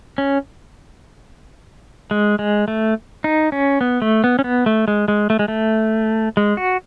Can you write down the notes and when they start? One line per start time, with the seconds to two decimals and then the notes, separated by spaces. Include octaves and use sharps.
0.18 C#4
2.11 G#3
2.39 G#3
2.68 A3
3.24 D#4
3.52 C#4
3.81 B3
4.02 A3
4.24 B3
4.39 C#4
4.44 B3
4.66 A3
4.88 G#3
5.08 G#3
5.30 A3
5.39 G#3
5.48 A3
6.37 G#3
6.57 F#4